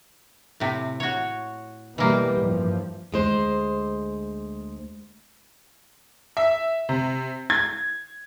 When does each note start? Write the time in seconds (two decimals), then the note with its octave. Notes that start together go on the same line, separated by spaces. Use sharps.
0.60 A2 C3
1.00 F#4 C#5
1.98 B2 E3 G3 A#3
2.45 G2 F3
3.12 D2 G#3 C5
6.37 E5
6.89 C3
7.50 G#6